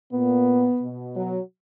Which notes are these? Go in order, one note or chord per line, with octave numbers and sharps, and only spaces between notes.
A#2 B3
B2
F#3